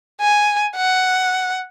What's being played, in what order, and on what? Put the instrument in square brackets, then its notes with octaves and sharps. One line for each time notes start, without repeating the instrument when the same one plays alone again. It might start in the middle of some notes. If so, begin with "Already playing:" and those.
[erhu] G#5
F#5